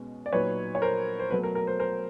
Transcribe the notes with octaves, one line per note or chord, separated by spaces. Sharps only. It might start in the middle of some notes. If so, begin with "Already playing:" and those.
Already playing: B2 G#3 C#4
D5
A#2 F#3 B3 D#4 B4 C#5
C#5
A#4 C5
C5
B2 F#3 A3 B4
A#4
A#4
A#4 C5
A#4 C5